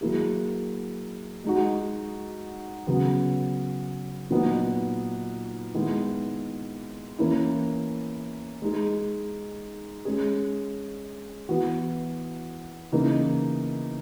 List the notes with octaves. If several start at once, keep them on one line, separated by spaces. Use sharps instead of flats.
F#3 A#3 E4 G#4
G#3 D#4 F#4
C#3 F#3 B3
A#2 F#3 B3 D#4
D#3 G#3 B3 E4 G#4
E3 A#3 C#4 E4
G#3 D#4 G#4
G#3 C#4 G#4
E3 B3 F#4
C#3 E3 A#3 D#4